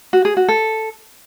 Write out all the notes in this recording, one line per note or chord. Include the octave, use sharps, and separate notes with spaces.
F#4
G#4
F#4
A4